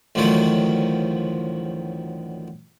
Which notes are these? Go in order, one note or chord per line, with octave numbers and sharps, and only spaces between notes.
A1 D2 D#3 F3 F#3